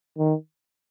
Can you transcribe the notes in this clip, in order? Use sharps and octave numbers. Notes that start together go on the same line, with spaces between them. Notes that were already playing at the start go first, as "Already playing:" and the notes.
D#3